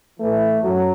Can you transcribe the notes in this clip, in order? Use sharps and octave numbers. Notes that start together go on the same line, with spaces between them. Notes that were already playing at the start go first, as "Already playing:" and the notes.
A2 E3 A3
F#2 F#3